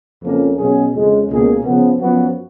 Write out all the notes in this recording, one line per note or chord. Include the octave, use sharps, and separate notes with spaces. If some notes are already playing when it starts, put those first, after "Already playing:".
F2 C#3 F3 A#3 C#4
B2 F#3 C#4 G#4
F2 C#3 G#3
C#2 B2 A#3 C#4 G#4
C#3 F3 B3
F#2 F3 B3 F#4